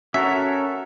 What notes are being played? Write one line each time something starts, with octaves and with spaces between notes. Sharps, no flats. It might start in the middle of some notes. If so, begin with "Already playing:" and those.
C#4 F#4 A4 A#4 E5